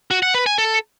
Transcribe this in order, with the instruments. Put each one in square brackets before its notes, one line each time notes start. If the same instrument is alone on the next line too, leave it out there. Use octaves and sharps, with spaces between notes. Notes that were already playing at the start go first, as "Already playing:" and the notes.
[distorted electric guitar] F#4
F#5
B4
G#5
A4